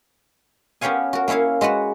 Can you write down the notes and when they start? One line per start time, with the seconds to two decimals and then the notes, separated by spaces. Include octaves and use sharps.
0.81 B3 C#4 G4 C#5 F5 G#5
1.13 F#4 A#4
1.28 A#3 C#4 E4 C#5 F5
1.61 G#3 F#4 B4 F#5